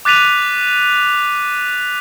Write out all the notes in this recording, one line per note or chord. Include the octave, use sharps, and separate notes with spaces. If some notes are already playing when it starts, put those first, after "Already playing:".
D6 F#6 A6 B6 D#7 F7